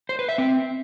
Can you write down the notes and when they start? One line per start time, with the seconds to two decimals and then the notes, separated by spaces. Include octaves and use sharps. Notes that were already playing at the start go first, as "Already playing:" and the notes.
0.09 C5
0.19 B4
0.29 E5
0.38 C4